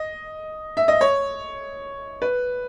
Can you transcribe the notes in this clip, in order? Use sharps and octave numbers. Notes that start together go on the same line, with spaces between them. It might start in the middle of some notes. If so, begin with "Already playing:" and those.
Already playing: D#5
E5
D#5
C#5
B4